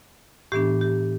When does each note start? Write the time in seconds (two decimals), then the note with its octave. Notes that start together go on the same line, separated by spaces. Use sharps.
0.52 A2 E3 B3 D4 G4
0.81 G4